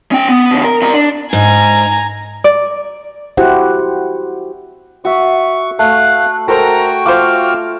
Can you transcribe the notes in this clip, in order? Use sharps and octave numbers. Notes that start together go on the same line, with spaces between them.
C#4 G5
B3
B2 D3
A#4
C3 A#4
D4
G#2 G#5 A#5
D5
E4 F#4 G4 C5 F#5
F#4 E5 C#6
A3 F5 F#6
F#4 A4 A#4 C5 C#5 G5 A#5
F4 C5 F5 D6 F6